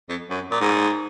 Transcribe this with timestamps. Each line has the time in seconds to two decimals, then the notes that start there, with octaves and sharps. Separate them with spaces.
0.09 F2
0.30 F#2
0.51 A#2
0.61 G#2